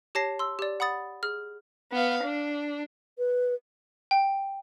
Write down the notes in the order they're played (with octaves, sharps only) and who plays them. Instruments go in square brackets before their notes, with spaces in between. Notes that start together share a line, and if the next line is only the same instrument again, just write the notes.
[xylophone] G4 C#5 A5 A#6 C7
C6 E6
G4 D5
F#5 B5 D#6 A6
G#4 F6
[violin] B3 F5
D4
[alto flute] B4
[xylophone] G5